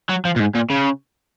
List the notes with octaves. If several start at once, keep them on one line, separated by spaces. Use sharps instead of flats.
F#3
F3
A#2
G#2
A#2
C#3